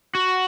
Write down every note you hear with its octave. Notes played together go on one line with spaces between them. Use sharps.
F#4